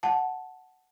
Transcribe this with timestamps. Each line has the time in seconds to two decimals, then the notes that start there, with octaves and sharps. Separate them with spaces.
0.03 F#5 A5